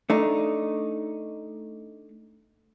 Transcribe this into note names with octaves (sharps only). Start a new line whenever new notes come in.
A3 D4 D#4